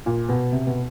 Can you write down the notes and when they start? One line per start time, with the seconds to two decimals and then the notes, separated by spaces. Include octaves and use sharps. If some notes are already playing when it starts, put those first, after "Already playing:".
0.06 A#2
0.29 B2
0.52 C3
0.66 B2